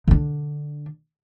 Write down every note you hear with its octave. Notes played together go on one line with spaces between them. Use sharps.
D3 D4